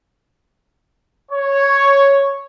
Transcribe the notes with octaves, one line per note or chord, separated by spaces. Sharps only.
C#5